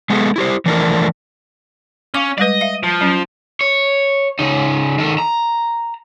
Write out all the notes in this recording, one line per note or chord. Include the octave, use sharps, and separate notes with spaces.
G#3 B3 E4 F#4 G#4 A4
E4 G4 C5
E3 F3 A3 D4 A#4
C#4 F5 D6
G3 G#3 B4 D5 D#5
E5 F5
F3
F#3 C#4
C#5
C#3 D#4
D#3 A4
A#5